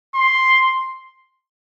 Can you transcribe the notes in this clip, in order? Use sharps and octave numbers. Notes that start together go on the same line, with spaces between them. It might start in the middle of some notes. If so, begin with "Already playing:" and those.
C6